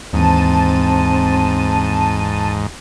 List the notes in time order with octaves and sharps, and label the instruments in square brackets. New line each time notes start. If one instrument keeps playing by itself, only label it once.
[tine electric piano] D#2 E3 [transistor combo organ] G#2 [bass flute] C4 [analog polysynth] A5 D#7